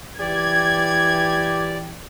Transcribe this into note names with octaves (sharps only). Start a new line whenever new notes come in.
E3 G4 D5 G#6